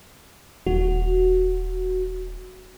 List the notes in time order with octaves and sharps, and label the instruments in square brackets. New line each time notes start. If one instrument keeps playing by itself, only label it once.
[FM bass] D#1 [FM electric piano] F#4